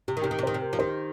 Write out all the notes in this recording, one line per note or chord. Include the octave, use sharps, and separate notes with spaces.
C3 G4
D#3
C3 G4
A#4
D#3
C3
C5
D#3
C3
A#4
F3
D#3 C5